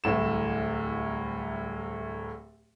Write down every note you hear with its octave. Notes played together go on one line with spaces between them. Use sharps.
D1 C2 A2 E7